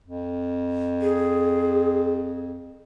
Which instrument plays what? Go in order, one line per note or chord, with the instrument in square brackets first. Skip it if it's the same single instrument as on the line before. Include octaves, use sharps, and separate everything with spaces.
[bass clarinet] F2
[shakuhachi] G#4